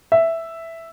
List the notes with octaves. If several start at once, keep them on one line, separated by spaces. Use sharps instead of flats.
E5